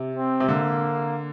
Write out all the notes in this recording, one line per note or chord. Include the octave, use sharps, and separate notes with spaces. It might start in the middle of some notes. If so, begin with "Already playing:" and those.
Already playing: C3
C4
C3
D3 A#3